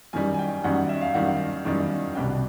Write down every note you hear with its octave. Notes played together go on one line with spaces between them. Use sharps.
F#2 D#3 G3 G#5
G#5
G5
F#2 D#3 G3 F#5
E5
F5
F#2 D#3 G3 F#5
F#2 D#3 G3
C2 B2 G3 B3 D4 G5